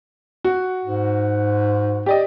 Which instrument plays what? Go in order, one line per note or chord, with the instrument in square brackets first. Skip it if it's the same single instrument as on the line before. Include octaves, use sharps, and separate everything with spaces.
[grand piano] F#4
[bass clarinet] G#2
[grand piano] G4 D5 D#5